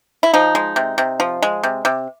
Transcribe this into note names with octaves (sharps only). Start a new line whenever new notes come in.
E4
F3 D#4
G#3
C3
C3
F3
G#3
C3
C3